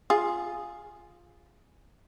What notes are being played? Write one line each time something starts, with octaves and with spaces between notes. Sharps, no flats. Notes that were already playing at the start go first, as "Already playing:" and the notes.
F4 G#4